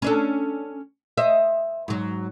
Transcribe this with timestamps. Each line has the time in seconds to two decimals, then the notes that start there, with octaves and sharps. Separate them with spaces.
0.02 C#4 D4 A4
1.17 C5 D#5 E5
1.88 G#2 F#3